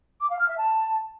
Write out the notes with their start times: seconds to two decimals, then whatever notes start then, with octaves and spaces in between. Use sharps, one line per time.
0.21 D6
0.30 F5
0.39 F6
0.49 E5
0.58 A5